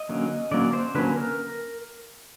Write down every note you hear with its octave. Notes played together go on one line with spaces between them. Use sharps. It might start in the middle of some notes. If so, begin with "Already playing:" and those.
Already playing: D#5
D3 F#3 A#3 C#4
D3 F#3 A#3 C#4 D5
C5
D3 F#3 A#3 C#4 B4
A#4